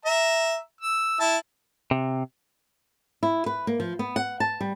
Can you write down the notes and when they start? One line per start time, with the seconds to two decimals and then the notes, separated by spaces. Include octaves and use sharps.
0.05 E5 A#5
0.81 E6
1.20 E4 A5
1.91 C3
3.23 E4
3.46 B4
3.67 A#3
3.80 F3
3.99 B3
4.16 F#5
4.40 A5
4.61 G3